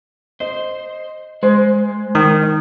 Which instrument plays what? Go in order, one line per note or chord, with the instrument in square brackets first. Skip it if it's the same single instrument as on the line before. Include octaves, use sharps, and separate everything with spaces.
[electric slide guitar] C5 [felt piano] D#5
[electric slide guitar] G#3 [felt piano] C5
[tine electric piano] D#3